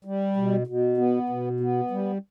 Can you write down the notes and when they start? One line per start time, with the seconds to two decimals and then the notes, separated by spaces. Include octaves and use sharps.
0.05 G3
0.36 B2
0.67 B2
0.97 B3
1.29 B2
1.60 B3
1.91 G3